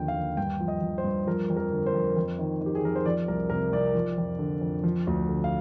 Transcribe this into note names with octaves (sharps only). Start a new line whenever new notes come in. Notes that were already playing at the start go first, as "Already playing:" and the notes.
Already playing: D#2 D3 F3 G5
F5
D#2
G2 G5
F3
D#5
F3
C5
G2
F3 A#4
F2
A#4
D3
C5
F2
F2
D#3
D#3
G4
G#4
F2 A#4
C5
F3 D5
C2 A#4
C3 A#4
C2 D5
F3
F2
D3
F2
F3
D2
D3
F5